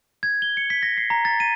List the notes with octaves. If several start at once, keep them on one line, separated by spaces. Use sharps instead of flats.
G#6
G7
C#7
B6
A#6
C7
A#5
A6
D#7